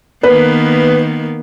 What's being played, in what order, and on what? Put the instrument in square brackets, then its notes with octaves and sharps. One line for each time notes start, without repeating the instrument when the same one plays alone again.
[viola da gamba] D#3 A#3 B3 [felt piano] B4